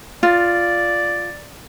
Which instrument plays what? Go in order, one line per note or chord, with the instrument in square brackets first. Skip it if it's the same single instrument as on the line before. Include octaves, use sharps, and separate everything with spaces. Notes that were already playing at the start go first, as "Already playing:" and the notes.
[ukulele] F4 [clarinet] D5